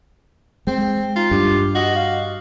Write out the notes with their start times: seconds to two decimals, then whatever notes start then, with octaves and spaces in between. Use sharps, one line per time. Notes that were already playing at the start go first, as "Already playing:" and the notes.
0.67 G#3 C4
1.16 D#4 F4
1.31 G2 G4
1.75 F#4 D#5
1.96 F5